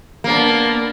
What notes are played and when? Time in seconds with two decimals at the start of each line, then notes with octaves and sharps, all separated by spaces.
0.24 A#3 B3 D4 A#4